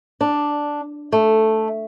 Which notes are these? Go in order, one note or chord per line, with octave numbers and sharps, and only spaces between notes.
D4
A3